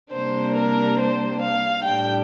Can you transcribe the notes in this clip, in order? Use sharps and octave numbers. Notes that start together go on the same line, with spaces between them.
C3 G3 A#3 D4 C5
A#4
C5
F5
A2 G3 D4 G5